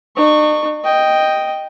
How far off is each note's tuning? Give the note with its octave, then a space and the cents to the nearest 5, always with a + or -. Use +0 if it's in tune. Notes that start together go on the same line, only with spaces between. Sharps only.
D#4 -45 C#6 +0
D#5 +0 G5 +0